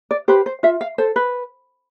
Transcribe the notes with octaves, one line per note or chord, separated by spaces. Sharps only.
D5
G4 B4 C5
C5
F4 E5
F5
A4 C5
B4